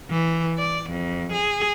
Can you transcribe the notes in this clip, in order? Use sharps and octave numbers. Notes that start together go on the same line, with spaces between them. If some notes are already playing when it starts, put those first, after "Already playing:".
E3
D5
F2
G#4